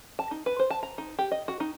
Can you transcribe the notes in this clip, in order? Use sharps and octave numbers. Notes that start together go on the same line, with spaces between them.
A5
D#4
B4
C5
A5
A#5
D#4
G4
D#5
F#4
D#4